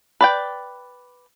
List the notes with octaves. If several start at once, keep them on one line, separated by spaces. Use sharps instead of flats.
B4 D5 G5